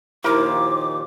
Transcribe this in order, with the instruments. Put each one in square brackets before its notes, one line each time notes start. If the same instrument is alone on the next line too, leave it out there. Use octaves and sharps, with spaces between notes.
[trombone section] D#2 [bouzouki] A#2 F3 [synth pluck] E4 A#4 [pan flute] D6